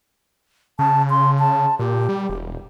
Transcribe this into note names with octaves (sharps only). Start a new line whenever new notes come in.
C#3 A5
C6
A5
A#2 G4
G3
E1